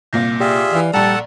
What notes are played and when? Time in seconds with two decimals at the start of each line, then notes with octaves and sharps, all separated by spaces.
0.13 C2 A#2 A#3 G6 A#6
0.40 F4 G4 G#4 D5 E5 G5
0.73 E3 D5 F5
0.93 A#1 G3 A4 F#5 A5 A#5